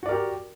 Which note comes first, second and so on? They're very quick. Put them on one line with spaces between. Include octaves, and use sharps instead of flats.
F#4 D5 A#4 G4